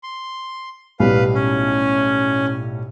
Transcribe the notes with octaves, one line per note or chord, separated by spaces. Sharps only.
C6
B1 A2 G3 B4 F5
C#4